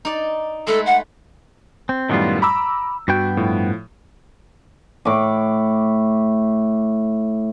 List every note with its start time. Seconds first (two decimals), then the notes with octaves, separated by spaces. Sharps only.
0.05 D#4 D5
0.67 G#3 A3 A4 B4
0.86 F#5
1.89 C4
2.09 F#2 A2 D#3 G3 B3 F4
2.42 A#5 B5 D6 E6
3.08 G2 B3 F#4 G5
3.37 A2 F3
5.05 A2 D6